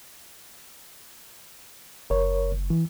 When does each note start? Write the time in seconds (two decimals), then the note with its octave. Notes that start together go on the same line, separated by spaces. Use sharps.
2.10 F#1 A#4 C#5
2.70 E3